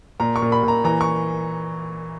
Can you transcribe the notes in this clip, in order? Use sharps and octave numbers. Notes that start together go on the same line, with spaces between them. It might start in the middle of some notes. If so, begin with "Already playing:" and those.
A#2 A#5
C#6
A#2
B5
A#2 A#5
E3 A#5
C#6